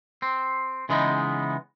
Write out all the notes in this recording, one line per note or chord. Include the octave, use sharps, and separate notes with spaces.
C4
C#3 E3 G#3 B3 D4 D#4